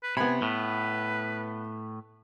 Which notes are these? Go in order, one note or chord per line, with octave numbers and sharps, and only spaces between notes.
B4
C3 B3 G#5 B5
A2 B4